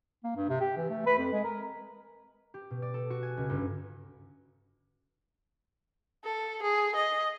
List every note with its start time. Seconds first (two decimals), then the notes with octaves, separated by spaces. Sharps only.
0.24 A#3
0.36 G2
0.49 C3
0.60 G4
0.77 E3
0.90 A3
1.06 B4
1.18 F2
1.32 G#3
1.44 A#4
2.54 G4
2.70 B2
2.82 D5
2.94 A4
3.10 F#4
3.23 G#5
3.37 C#2
3.49 G1
6.24 A4
6.63 G#4
6.96 D#5